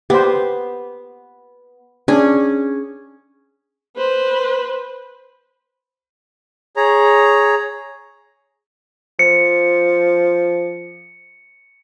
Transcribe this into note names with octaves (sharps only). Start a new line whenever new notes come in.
B3 G4 C5
C#4 D4 G#4
B4 C5
G#4 C#5 A#5
F3 C#7